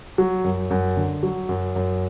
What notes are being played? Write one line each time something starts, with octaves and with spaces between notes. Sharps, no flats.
F#3
F#2
F#2
D3
F#3
F#2
F#2